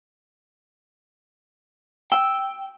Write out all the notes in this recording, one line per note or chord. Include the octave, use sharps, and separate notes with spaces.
G5 E6